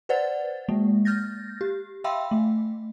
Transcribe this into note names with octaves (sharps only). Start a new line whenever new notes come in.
B4 C5 D5 F#5 A6
G#3 A#3
F6 G6 A6 A#6
G4
E5 F5 G5 B5 C6 E6
A3